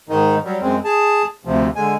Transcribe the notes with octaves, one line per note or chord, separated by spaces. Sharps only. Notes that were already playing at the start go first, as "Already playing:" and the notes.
G#2 D#3 D#4
F#3 G3
F#2 G#3 C4
G#4 A5
D2 C3 F3
D3 G#3 G#5